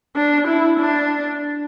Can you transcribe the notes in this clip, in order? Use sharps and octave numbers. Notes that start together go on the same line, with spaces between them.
D4
E4
D4